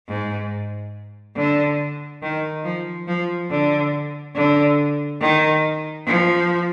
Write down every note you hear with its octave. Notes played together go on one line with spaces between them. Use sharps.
G#2
D3
D#3
F3
F3
D3
D3
D#3
F3